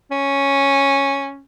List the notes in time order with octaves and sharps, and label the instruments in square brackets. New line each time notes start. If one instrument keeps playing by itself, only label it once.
[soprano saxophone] C#4